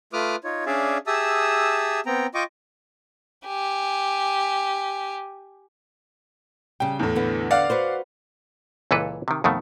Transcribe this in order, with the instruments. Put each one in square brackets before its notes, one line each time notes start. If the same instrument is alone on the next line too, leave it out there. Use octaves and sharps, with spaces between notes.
[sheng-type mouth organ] A3 F4 B4 D6 D#6 F6
D#4 F4 C#5
C#4 D4 G#4 D5 E5 F5
G4 G#4 E5 A5 D#6 E6
B3 C4 G5 A#5
F4 D#5 G5 C#6 D6
[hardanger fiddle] G4 G#5
[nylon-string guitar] C#3 G3 [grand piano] G5
[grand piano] E2 A2
[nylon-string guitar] D3 B3
[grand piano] D5 F5 F#5
[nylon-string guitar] F#4 B4 C5
[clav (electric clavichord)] C#2 A#2 E3 A4 B4
C3 D#3
F2 B2 D#3 A3